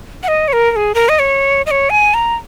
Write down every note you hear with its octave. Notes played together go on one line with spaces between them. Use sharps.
F#5
D#5
C#5
A#4
A#4
G#4
A#4
D#5
C#5
D#5
C#5
G#5
A#5